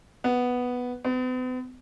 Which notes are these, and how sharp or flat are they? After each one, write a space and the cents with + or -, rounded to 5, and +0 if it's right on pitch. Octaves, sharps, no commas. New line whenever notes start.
B3 +0
B3 +45